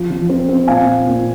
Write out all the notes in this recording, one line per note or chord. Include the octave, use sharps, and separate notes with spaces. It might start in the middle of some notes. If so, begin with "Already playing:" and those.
Already playing: F3
F3
C4
C4
A#2 F5 G#5
A#2
A#2